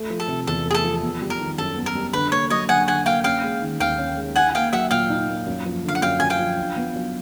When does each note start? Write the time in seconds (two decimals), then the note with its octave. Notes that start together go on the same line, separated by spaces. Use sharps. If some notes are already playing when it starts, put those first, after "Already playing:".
Already playing: A3
0.10 F3
0.20 A4
0.28 C3
0.47 E2 A4
0.65 A3
0.71 G#4
0.74 A4
0.84 F3
1.03 B3
1.22 G3
1.30 A#4
1.40 D#3
1.58 F#2 A4
1.76 B3
1.86 A#4
1.95 G3
2.13 D3 B4
2.32 A#3 C#5
2.50 F#3 C#5 D#5
2.69 D3 F#5 G#5
2.88 D3 F#5 G#5
3.06 A#3 F5 G5
3.24 C#4 F5 G5
3.44 G#3
3.62 D#3
3.80 D#2 F5 G5
3.99 C#4
4.17 G#3
4.36 D#4 F#5 G#5
4.55 A#3 F5 G5
4.73 F#3 E5 F#5
4.91 A#2 F5 G5
5.10 D#4
5.29 A#3
5.46 F#2
5.66 F3
5.84 D3 F5
5.95 F#5
6.02 F#2 F5 G5
6.20 F#2 G#5
6.30 F5 G5
6.39 F3
6.58 D4
6.77 B3
6.96 F#3